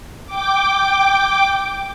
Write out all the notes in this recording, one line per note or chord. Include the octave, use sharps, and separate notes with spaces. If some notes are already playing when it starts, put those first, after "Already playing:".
G5 D6